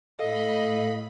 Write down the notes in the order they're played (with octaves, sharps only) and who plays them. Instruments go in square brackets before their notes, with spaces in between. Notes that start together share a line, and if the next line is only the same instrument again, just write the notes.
[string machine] A2 B5 [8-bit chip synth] A4 F5 [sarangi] D#5